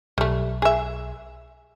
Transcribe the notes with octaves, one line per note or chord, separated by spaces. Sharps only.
B1 G3 A3
G#4 E5